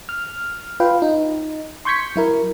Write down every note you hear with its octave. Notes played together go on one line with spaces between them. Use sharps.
F6
F4 B4 F5 G5
D#4
C6 C#6 G6 G#6 B6 C#7
F#3 E4 A#4